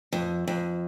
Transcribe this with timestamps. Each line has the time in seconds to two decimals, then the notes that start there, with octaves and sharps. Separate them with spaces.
0.13 F2
0.48 F2